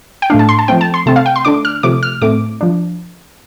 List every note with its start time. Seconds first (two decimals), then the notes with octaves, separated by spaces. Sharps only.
0.22 G5
0.30 A2 A3 D4 F5
0.39 A5
0.49 C6
0.59 A5
0.68 F3 A3 C4 G5
0.81 A5
0.94 C6
1.06 C3 A3 C4 A5
1.16 F5
1.26 G5
1.36 C6
1.45 D3 A3 D4 D6
1.65 F6
1.83 C3 F3 A3 D6
2.03 F6
2.22 A2 A3 C4 D6
2.61 F3 D4